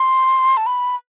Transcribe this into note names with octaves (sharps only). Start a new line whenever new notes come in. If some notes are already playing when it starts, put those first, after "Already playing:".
Already playing: C6
A5
B5